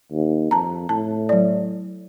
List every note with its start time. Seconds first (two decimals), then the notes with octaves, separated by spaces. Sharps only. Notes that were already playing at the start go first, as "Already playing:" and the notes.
0.11 D#2
0.51 F2 A5 A#5
0.89 A2 A5
1.29 F#3 D5